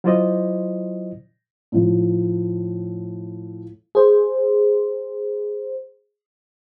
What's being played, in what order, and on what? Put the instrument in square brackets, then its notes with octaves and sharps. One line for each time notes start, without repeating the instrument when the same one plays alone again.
[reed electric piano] F#3 E4 F4 C5 D5 D#5
[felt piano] A2 F3
[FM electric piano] G#4 C5